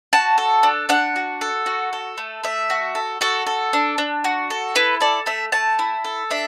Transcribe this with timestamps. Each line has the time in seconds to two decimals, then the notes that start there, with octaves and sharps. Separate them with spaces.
0.13 F#4 A5
0.38 A4
0.63 D4
0.89 D4 F#5
1.16 F#4
1.41 A4
1.66 F#4
1.93 A4
2.18 A3
2.44 A3 E5
2.70 F#4
2.95 A4
3.21 F#4 A4
3.47 A4
3.73 D4
3.98 D4
4.24 F#4
4.50 A4
4.75 E4 B4
5.01 A4 D5
5.26 A3 E5
5.52 A3 A5
5.79 E4
6.04 A4
6.31 D4 E5